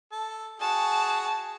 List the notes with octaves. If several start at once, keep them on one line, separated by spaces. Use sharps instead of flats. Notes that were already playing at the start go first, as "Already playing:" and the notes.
A4
F#4 G#4 A5